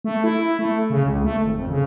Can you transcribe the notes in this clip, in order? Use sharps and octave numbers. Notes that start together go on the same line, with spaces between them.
A3
E4
A3
C#3
C#2
A3
G#1
F2
C#3